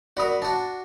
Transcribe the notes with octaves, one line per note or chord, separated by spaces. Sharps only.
F#4 A#4 D5 B5 D#6
D4 F#4 A5